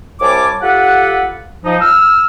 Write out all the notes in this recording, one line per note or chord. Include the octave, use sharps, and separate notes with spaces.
C2 G3 C#5 G#5 A5 D6
F4 G4 A4 B4 F#5
F3 D#4
E6 F6